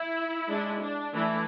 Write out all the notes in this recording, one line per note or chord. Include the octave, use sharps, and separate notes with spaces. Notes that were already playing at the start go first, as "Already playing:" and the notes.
Already playing: E4
G#3 D4
D4
E3 A3 D4 E4